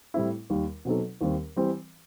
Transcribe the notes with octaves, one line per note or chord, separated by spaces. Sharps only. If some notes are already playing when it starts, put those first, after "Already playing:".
A2 G3 C4 E4
D#2 D#3 G3
B2 F#3 C4 D#4 A4
D#2 D#3 G3 C4
E3 G3 C4